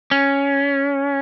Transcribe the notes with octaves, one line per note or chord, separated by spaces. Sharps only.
C#4